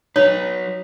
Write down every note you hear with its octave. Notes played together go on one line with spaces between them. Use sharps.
F#3 D#4 B4 C#5